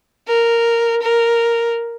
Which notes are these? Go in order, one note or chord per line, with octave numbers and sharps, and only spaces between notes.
A#4
A#4